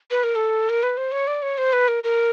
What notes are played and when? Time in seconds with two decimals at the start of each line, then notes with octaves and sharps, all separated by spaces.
0.11 B4
0.23 A#4
0.35 A4
0.69 A#4
0.83 B4
0.97 C5
1.12 C#5
1.27 D5
1.42 C#5
1.58 C5
1.73 B4
1.88 A#4
2.04 A#4